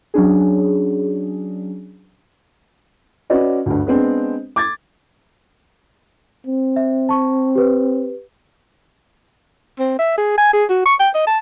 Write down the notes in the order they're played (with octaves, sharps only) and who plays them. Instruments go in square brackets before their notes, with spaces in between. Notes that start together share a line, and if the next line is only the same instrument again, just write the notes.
[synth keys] F#3 C#4 D4 G#4
[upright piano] C#4 F#4 B4 D5 D#5
D2 G2
G#3 B3 C4 D4
D6 G#6 A6
[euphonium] C4
[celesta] E5
A5 C#6
G4 B4
[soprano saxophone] C4
E5
G#4
G#5
G#4
F#4
C#6
G5
D#5
A5